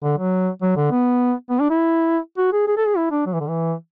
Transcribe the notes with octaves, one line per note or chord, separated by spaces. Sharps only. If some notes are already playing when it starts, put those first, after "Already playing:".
D3
F#3
F#3
D3
B3
B3
D4
E4
F#4
G#4
G#4
A4
G#4
E4
D4
F#3
E3
D3
E3